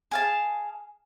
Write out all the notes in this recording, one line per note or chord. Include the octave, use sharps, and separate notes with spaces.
G#4 F5 A5